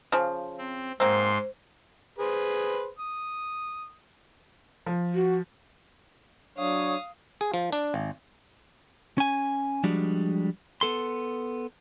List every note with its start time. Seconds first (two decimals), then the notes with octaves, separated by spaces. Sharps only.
0.12 C#3 F3
0.58 C4
1.00 G#2 A#3 C4 C5 C6
2.19 G#4 B4 C5
2.98 D#6
4.86 F3
5.14 F#4
6.58 F#3 D4 C#5 F5 D#6
7.41 G#4
7.54 F3
7.72 D4
7.94 G#1
9.18 C#4 G#5
9.84 F3 G3 G#3 D4 F#4
10.81 B3 A4 C6